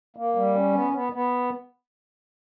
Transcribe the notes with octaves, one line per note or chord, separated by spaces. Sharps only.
A#3
G3
C#4
B3
B3
B3